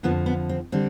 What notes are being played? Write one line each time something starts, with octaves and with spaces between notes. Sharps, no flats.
F2 D3 F3 B3
B3
C4
D3 G3 C4